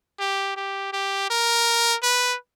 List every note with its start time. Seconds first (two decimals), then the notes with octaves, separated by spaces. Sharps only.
0.19 G4
0.57 G4
0.93 G4
1.30 A#4
2.03 B4